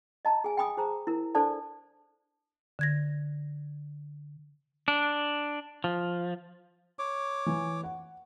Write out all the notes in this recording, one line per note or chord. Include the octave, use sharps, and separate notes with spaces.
D#5 A5 A#5
G#4 G#5
G5 G#5 B5 D6 D#6
G#4 C5 A5 A#5
E4 A#4
D4 A4 C5 D5 A5
D3 G#6 A#6
D4
F3
C#5 D6
E3
F#5